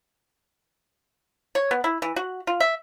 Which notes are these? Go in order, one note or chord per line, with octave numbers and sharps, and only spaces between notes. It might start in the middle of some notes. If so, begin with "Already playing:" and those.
C#5
B3
E4
E3
F#4
F4
E5